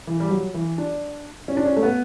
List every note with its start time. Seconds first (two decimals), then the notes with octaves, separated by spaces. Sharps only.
0.07 E3
0.20 G3
0.31 F#3
0.54 E3
0.78 D4
1.48 C#4
1.57 D4
1.66 C#4
1.76 A3
1.83 B3